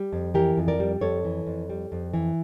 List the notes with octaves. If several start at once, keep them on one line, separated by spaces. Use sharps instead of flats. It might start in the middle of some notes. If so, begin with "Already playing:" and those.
Already playing: G3
F2
E3 G4 A#4
F2
A#4 D5
G3
F2 A4 C#5
E3
F2
G3
F2
E3